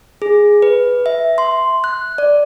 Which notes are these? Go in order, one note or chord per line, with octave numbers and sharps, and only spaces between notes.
G#4
B4
E5
C6
F#6
D5